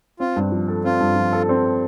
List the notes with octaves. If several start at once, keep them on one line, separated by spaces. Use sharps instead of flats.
C4 F4
G2
F3
A4
C4 F4
G2
F3
A4
C4